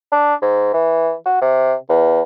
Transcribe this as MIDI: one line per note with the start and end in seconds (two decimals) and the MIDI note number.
0.12 0.35 62
0.42 0.71 44
0.74 1.14 52
1.26 1.38 66
1.42 1.75 48
1.90 2.22 40